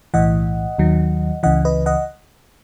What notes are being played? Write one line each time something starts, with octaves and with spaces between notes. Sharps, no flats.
B1 A2 E3 D#5 F#5
D#2 D#3 F#3
C#2 C#3 E3 D#5 F#5
B4 D#5
D#5 F#5